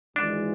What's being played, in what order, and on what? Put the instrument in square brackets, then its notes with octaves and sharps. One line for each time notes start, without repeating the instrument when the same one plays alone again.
[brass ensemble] G#1 G#2 E3 G#3 [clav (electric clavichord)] D4